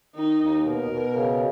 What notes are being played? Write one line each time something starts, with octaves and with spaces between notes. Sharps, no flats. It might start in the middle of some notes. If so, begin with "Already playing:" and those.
D#3 D#4
D#2
B2 A#4
B2
C#3